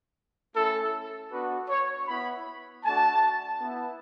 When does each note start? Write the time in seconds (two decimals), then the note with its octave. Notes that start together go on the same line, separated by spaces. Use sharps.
0.54 A3 C#4 E4 A4
1.31 B3 D4 F#4 B4
1.69 C#5
2.07 B3 E4 B5
2.85 A3 D4 F#4 A5
3.61 B3 E4